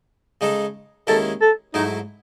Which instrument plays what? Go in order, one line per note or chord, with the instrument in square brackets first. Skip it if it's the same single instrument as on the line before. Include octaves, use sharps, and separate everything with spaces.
[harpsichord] C#3 G#3 D#4 A4
[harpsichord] D#2 D#3 G#3 C#4 E4 [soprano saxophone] A4
[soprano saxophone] A4
[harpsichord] G#2 F#3 A3 E4 [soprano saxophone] D#4